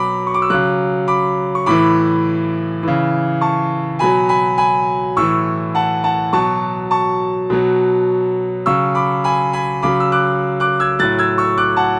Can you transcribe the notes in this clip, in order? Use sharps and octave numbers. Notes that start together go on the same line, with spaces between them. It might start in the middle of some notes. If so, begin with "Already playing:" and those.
Already playing: B2 F#3 B5 D6
C#6
D6
E6
C#3 F#3 D6 F#6
B5 D6
C#6
A2 E3 B5 D6
C#3 E3
A5 C#6
B2 F#3 G#5 B5
G#5 B5
G#5 B5
A2 E3 C#6 E6
F#5 A5
F#5 A5
B2 F#3 A5 C#6
A5 C#6
B2 F#3
C#3 F#3 C#6 E6
B5 D6
G#5 B5
G#5 B5
C#3 F#3 B5 D6
E6
D6 F#6
D6 F#6
E6 G#6
A2 F#3 F#6 A6
E6 G#6
C#6 E6
D6 F#6
F#5 A5